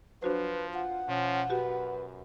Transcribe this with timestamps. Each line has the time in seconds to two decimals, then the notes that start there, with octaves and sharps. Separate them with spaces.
0.23 F3 F#3 D4 F#4 B4 C5
0.74 F4 F#5
1.08 B2 F3 C#4
1.50 F#2 F#4 G4 B4